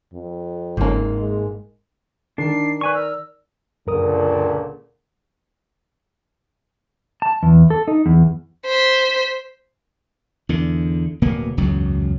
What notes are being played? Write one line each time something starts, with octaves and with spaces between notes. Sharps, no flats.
F2
G1 G#2 A#3 C#4
G#3
D#3 D4 C7
B4 D5 G#5 C#6
A#4 E6
C#2 F#2 A#2 D3 A#4 D#6
A5
E2
A4
D#4
E2
C5 B6
E2 D3
D1 B2 A#3 B3
E1 C#2 F#2 F#3